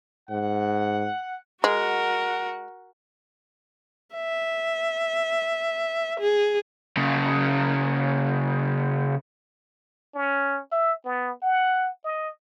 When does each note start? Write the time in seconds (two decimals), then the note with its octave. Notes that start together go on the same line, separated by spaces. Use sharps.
0.30 G#2 F#5
1.64 G#3 F#4 A#4 F#5
4.16 E5
6.20 G#4
6.97 C#3 A#3
10.15 C#4
10.72 E5
11.05 B3
11.42 F#5
12.05 D#5